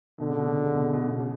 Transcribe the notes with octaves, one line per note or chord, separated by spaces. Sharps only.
B2 D3
C#3
B2
C#3
B2
C#3
B2
C#3
B2
C#3
B2
C#3